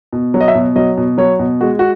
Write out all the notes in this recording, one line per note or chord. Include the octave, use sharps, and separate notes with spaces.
B2
F#3
D#5
E5
B2
F#3 D#5
B2
F#3 C#5
B2
G#3 F#4
F#4